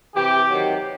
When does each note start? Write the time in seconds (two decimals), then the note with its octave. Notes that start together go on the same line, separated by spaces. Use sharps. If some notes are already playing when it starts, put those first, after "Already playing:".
0.16 C3 E3 G4
0.48 C3 D#3 F#3